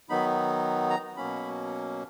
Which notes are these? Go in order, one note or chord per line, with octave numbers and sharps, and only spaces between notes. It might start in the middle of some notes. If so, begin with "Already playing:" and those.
D#3 F#3 B3 D#4 B5
A#5
B2 F#3 A#3 C#4 B5